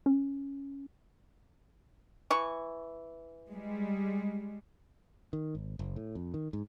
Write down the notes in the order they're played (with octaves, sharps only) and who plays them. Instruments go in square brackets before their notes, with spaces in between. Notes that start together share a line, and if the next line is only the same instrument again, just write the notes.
[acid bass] C#4
[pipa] E3 C#6
[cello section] G3 G#3
[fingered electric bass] D#3
G#1
F#1
A2
F2
D#3
G#2